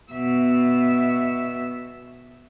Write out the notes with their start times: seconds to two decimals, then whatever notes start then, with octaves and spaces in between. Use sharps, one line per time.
0.12 B2 E5